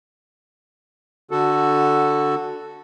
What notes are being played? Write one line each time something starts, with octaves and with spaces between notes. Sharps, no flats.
D3 F#4 A4